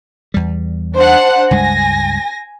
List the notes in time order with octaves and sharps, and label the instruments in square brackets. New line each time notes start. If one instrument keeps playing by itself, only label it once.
[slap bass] E2 G3
[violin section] D4 C5 F#5
[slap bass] C#2 G2 G#3 [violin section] G#5 A#6